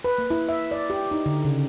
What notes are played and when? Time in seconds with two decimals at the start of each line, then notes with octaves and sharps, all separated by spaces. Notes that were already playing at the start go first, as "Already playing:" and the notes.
0.04 B4
0.18 A#3
0.30 E4
0.49 E5
0.71 D5
0.90 G4
1.11 D#4
1.26 D3
1.45 C#3